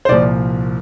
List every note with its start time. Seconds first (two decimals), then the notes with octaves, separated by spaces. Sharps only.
0.05 C5
0.09 C2 A#2 F3 D5